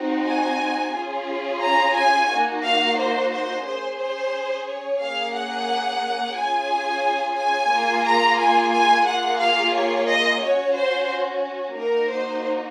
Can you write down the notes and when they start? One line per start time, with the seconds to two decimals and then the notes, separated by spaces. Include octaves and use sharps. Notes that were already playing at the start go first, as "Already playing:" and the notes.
Already playing: C4 D#4 F#4
0.26 G#5
0.94 C#4 F4 G#4
1.62 A#5
1.95 G#5
2.29 A#3 D#4 F#4
2.63 F5
2.97 C5
3.30 C5
3.65 C#4 G#4 C5
3.98 C5
4.66 C#5
4.99 A#3 C#4 G#4 F5
5.33 F#5
6.35 C#4 F4 G#4 G#5
7.36 G#5
7.70 A#3 F4 G#4
8.04 A#5
8.37 G#5
8.72 G#5
9.05 A#3 F4 G#4 F#5
9.39 F5
9.74 C#5
10.07 D#5
10.41 C#4 F#4 C#5
10.75 C5
11.76 A#3 D#4 F#4 A#4
12.10 C5